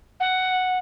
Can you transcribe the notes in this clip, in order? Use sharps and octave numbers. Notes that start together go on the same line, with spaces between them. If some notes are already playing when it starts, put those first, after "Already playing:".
F#5